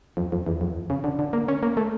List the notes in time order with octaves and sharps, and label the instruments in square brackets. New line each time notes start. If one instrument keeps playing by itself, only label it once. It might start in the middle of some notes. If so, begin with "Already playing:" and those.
[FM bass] F2
F2
E2
F2
C#3
D3
D3
A#3
C#4
A#3
A3